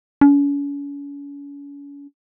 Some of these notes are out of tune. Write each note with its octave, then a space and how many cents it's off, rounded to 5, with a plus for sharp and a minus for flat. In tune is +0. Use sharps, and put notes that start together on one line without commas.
C#4 +40